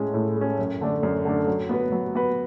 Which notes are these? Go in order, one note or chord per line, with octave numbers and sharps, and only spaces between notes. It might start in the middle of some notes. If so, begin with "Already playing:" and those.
Already playing: A2 G#3 C#4
A2
G#3 C#4
F#2
D3 A3 D4
F#2
D3 A3 D4
F#3
B3 F#4 B4
F#3
B3 F#4 B4